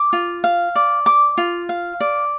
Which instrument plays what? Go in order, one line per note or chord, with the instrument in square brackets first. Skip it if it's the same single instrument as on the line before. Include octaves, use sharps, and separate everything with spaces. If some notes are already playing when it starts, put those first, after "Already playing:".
Already playing: [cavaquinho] D6
F4
F5
D5
D6
F4
F5
D5